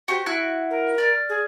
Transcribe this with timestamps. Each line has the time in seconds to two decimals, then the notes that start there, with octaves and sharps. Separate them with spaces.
0.08 F#4 G4 C5
0.26 E4 F#4 F#6
0.70 A#4
0.98 D5 F6
1.29 G#4